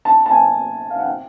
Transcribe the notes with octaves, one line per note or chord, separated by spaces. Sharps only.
A5
A5
G#5
F5
F#5
G5